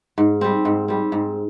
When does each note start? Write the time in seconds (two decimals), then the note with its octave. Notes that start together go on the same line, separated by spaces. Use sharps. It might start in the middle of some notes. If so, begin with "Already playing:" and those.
0.18 G#2
0.41 G3 C4
0.65 G#2
0.88 G3 C4
1.12 G#2